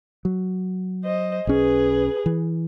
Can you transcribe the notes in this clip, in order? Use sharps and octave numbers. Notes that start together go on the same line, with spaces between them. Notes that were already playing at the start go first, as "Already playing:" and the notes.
F#3
C5 D#5
B1 C#4 G#4 B4
E3